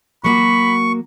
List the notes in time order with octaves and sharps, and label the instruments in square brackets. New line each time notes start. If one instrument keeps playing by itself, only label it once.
[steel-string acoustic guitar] F#3 A#3 F#4 [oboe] B5 [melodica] C#6